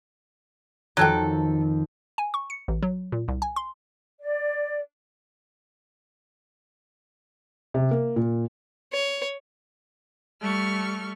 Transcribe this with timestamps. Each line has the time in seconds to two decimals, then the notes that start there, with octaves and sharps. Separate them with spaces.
0.97 F2 D#3 F#3 A4 G5
2.18 G#5
2.34 C#6
2.50 C#7
2.68 A1
2.83 F#3
3.12 A#2
3.28 C2
3.42 G#5
3.56 C6
4.20 D5
7.74 C3
7.91 A#3
8.16 A#2
8.93 C#5
10.41 G3 A3 C#6 F6